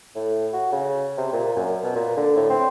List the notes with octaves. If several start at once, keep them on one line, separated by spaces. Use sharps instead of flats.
A2
F#4
C#3
C3
A#2
F#2
B2
A#2
D3
A2
C4